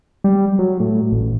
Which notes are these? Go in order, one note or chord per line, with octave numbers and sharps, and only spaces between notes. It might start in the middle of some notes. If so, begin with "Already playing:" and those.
G3
F#3
A2
A1